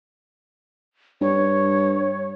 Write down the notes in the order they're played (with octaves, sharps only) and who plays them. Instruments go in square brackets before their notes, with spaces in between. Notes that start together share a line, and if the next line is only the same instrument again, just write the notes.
[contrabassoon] G2 [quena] C#5